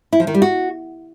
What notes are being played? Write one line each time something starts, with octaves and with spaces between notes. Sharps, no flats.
E4
F3
D#3
G3
F#4